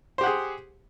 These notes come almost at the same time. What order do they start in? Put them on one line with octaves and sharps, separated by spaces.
C5 G4 F#5 G#4